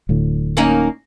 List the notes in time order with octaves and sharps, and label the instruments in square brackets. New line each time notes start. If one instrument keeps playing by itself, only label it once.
[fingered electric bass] D1 D2 A2
[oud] A#3 C#4 D#4